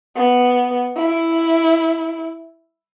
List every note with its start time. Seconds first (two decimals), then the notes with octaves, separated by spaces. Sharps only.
0.16 B3
0.97 E4